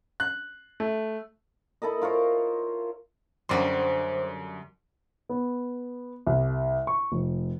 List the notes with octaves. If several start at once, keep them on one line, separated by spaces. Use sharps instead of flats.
F#6
A3
E4 A4 A#4 D#5
F4 A#4 C5 C#5
F#2 D3 F#3 G3 C5 D5 C6
B3
C2
C#6
F1